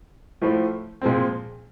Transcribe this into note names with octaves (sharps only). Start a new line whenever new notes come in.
A2 F3 A3
A#2 F3 G#3 C4